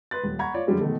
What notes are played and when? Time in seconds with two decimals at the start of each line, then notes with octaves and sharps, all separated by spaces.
0.11 B4 C6 F#6 A6
0.24 D#1
0.39 F#5 A#5 B5 C#6 G#6
0.54 F4 C#5 D5
0.67 F#2 D3 F3 G3 G#3
0.81 B2 D#3 G#3 A3